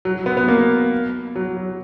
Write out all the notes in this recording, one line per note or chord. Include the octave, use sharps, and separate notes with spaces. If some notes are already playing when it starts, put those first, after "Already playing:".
F#3
B3
B3
A#3
F#3
F#3